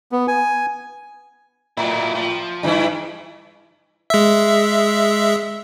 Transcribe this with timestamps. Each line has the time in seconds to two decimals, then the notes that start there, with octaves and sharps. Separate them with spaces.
0.12 B3
0.28 G#5
1.77 A2 F#3 E4
2.15 F3
2.63 G2 E3 E4
4.10 G#3 E5